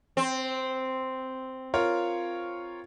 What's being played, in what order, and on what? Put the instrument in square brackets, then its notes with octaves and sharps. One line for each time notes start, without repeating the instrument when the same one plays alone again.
[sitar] C4
[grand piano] F4 A#4 C#5